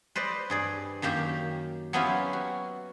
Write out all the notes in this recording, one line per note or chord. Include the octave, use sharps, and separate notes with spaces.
B4 C5 D5 D#5
G2 G#4 D5
F#2 D#3 A#3 G4 G5 A#5
F#3 B3 C#4 E4 F4 G4
F#4